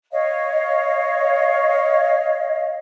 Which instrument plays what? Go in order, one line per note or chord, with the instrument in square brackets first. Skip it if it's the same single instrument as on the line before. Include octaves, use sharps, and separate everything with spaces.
[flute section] C#5 D#5 F5